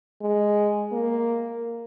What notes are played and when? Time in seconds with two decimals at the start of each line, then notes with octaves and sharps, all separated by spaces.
0.21 G#3
0.92 A#3